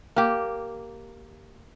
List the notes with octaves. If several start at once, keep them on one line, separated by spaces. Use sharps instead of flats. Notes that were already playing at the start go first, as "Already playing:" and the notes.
A#3 G4